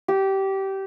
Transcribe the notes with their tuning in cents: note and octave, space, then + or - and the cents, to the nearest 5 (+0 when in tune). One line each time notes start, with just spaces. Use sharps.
G4 -20